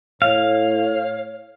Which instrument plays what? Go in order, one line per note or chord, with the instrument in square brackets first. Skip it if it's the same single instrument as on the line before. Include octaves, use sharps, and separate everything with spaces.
[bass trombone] A2 [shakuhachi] C#5 [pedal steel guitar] F5